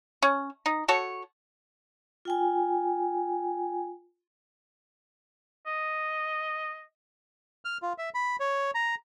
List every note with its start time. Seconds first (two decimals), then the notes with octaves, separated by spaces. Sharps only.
0.22 C#4
0.66 D#4
0.88 F#4 A4 C#5
2.25 F4 G5 G#5
5.67 D#5
7.65 F6
7.82 F4
7.98 E5
8.14 B5
8.40 C#5
8.75 A#5